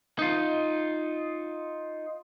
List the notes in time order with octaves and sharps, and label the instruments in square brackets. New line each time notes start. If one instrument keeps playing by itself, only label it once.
[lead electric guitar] D#4 F4